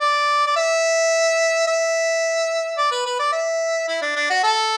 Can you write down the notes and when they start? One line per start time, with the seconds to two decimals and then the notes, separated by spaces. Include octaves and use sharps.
0.01 D5
0.46 D5
0.56 E5
1.67 E5
2.78 D5
2.91 B4
3.06 B4
3.19 D5
3.32 E5
3.88 E4
4.02 D4
4.16 D4
4.30 F#4
4.44 A4